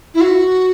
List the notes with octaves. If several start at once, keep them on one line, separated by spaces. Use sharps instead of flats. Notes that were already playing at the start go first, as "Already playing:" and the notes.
E4
F#4